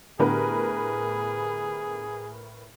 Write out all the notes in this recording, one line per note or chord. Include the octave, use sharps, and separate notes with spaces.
A2 D3 B3 G4 G#4 A#4 B4